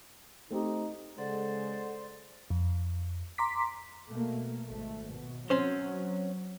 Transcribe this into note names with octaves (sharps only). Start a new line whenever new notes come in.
A3 C4 D#4 G4
C#3 G#3 A4 C5 D5 F#5
F2
A#5 C6 D6 B6
B2 A3 A#3
G#1 A3
B2
F#3 C4 C#4 C5